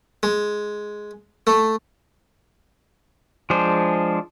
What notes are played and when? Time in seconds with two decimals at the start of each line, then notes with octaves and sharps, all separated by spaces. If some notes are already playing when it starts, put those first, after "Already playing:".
0.23 G#3
1.47 A3
3.50 F3 G#3 D4 G#4 C5